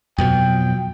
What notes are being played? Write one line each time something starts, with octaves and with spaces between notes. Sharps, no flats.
F2 B2 F#3 G5